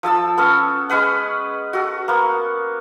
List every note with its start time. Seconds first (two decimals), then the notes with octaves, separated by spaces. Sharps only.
0.03 F3 A4 A5 E6
0.38 B3 C#4 A4
0.89 G#3 C#4 B4 F#5
1.73 F#4 A4
2.08 A#3 B3